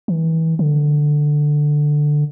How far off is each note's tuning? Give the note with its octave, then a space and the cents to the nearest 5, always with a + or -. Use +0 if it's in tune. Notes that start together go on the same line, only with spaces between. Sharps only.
E3 -30
D3 +10